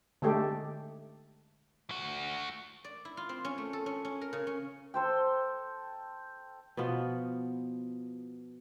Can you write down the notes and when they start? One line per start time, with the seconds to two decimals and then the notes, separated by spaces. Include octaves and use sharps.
0.22 D3 G#3 A3 G4 A4
1.90 A3 F#4
2.84 D5
3.05 E4
3.17 F4
3.29 C4
3.45 C#4
3.58 A3
3.73 A4
3.86 C#4
4.05 C#4
4.21 A#4
4.33 C#3
4.47 C#4
4.94 A4 C5 G5
6.77 B2 F3 B3 F4